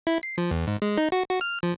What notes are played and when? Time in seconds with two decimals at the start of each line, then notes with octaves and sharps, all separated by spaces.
0.07 E4
0.23 C7
0.38 F3
0.51 E2
0.67 G#2
0.82 G#3
0.97 D#4
1.12 F#4
1.29 F#4
1.41 F6
1.63 F3